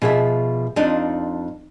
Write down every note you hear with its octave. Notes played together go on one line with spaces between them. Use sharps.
B2 F3 G#4 C5 E5
F2 D4 D#4 F4